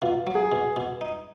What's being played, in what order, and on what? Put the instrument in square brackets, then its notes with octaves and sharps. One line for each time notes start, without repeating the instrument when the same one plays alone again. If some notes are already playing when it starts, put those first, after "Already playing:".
[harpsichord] B2 [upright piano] F4
[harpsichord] F#3
[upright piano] G#4
[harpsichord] B2
B2
D#4